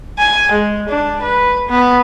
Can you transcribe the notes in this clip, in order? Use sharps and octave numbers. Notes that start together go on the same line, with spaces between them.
G#5
G#3
D4
B4
B3